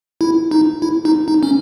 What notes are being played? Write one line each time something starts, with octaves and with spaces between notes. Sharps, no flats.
E4
D#4
E4
D#4
D#4
C#4